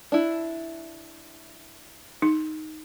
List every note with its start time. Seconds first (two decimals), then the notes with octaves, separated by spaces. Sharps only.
0.12 D4 E4
2.22 D#4